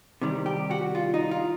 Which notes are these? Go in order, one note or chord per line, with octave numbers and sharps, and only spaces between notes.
C3 D#3 G3
G4
F#4
F4
D#4
F4